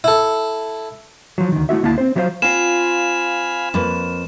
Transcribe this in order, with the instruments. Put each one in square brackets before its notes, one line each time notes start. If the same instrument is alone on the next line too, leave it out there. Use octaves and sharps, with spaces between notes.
[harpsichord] E4 A4
[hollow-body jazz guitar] F3 F#3
D2 D#3
A3 E4 F#4 E5
D2 A#3 E4 A5
C4 C5
F3 F#3 E4 F4 C5 F5
[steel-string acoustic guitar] C4 F4 [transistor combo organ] F5 G#5 B5 [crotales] E7
[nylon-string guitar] F2 A#3 B4